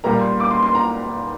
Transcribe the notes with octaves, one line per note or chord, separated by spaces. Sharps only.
A#2 G3 A#3 A#5
C6
D6
C6
C6
A#5